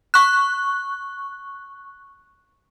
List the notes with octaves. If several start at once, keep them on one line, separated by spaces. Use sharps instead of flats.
C#6 F#6